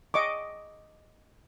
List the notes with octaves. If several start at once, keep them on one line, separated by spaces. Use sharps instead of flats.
D#5 C#6 D6